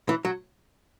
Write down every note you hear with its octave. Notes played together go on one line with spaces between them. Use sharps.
E3
F#3